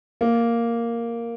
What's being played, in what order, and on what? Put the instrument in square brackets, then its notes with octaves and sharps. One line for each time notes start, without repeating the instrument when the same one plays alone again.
[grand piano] A#3